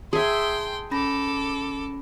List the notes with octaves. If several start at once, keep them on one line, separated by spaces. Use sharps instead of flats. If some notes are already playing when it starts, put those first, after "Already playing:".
G#4 E5 G5 A5 C6
C#4 A4 B5 D6 A#6